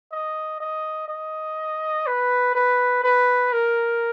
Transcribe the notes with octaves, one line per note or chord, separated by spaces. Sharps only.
D#5
D#5
D#5
B4
B4
B4
A#4